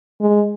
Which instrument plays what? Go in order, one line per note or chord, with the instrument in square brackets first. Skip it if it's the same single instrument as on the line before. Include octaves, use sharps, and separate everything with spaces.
[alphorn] G#3